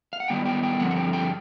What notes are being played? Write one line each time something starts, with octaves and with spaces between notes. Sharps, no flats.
F5
F#5
D#3 G3 B3 G5
G5
G5
G2 D3 F3 C4 F#5
F#5
G5
G5